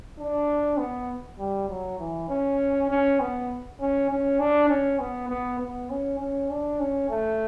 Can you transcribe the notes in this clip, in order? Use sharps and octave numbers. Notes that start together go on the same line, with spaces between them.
D4
B3
G3
F#3
E3
C#4
C#4
B3
C#4
C#4
D4
C#4
B3
B3
B3
C#4
C#4
D4
C#4
A3